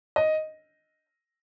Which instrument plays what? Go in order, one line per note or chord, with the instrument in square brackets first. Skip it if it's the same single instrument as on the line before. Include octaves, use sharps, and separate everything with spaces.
[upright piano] D#5